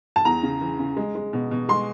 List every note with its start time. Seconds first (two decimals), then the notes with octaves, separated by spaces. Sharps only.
0.16 A5
0.25 E2 A#5
0.43 C#3
0.61 E3
0.79 C#3
0.97 G#3
1.15 G#3
1.33 B2
1.51 B2
1.69 G#3 C6